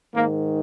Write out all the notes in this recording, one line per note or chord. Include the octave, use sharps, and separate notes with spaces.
G#2 D#3 A#3